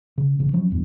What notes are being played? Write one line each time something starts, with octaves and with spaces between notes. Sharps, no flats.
C#3
A1 C#3
F3 F#3 C#4
A1 E2 G2